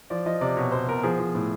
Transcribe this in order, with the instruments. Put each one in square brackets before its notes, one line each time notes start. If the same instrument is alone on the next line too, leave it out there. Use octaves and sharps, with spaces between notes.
[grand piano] F3 D5
F3 D#5
C3 D5
B2 C#5
B2 C5
B2 A#4
F3 G#4
F3
A2